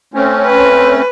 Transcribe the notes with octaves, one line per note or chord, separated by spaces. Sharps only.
A3 C4 C#4
B4